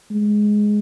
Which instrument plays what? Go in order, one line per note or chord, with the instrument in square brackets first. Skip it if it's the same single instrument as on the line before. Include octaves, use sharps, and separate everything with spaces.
[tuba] G#3